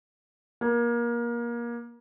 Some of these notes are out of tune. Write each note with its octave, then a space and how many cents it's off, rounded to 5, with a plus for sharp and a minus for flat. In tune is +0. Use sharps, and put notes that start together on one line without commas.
A#3 +25